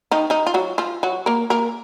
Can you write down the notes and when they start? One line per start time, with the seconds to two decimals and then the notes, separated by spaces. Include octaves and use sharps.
0.11 D#3 D#4
0.30 D#3 D#4
0.47 F4
0.54 F#3 F#4
0.78 F3 F4
1.03 F#3 F#4
1.26 A#3 A#4
1.50 A#3 A#4